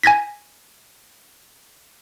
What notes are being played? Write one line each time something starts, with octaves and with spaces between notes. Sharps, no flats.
G#5 G#6 A#6 B6